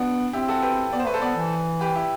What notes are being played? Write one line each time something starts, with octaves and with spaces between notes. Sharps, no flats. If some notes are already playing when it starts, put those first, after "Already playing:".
Already playing: B3 D4 F#4
C4 E4 G4
F#4 A4
G4 B4
B3 D5
C5
A3 B4
A4 C5
B3 B4 D5
E3
G4 B4
E4 G4